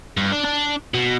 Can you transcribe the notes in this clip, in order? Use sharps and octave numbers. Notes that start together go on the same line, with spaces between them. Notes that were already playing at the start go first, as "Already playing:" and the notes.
G2
D4
D4
B2